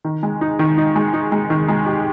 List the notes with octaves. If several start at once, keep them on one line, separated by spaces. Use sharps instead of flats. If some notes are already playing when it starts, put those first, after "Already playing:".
D#3
G#3
D#4
D#3
D#4
G#3
D#4
G#3
D#3
G#3
G4